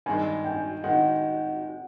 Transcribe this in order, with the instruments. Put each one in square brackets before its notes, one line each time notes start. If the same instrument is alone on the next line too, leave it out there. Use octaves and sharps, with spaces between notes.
[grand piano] G2 D#3 G#3 [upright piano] G#5
[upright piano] G5
[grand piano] D#3 G#3 [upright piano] F#5